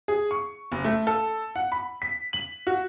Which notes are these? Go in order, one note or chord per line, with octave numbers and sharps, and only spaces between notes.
G#4
C#6
F#1
A3
A4
F#5
B5
B6
F#7
F#4